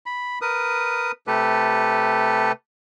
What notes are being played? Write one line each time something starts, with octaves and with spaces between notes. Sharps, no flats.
B5
A#4 B4 D#6
C3 A3 G4 A4 B4